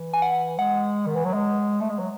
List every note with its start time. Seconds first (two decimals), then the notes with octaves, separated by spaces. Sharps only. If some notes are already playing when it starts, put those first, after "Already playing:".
Already playing: E3
0.14 G#5
0.22 F#5
0.59 G#3 F#5
1.06 D#3
1.16 E3
1.25 F#3
1.34 G#3
1.81 A3
1.90 G#3
1.99 F#3